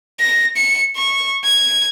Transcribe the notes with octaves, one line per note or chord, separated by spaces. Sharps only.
A#6
C#7
C#6
G#6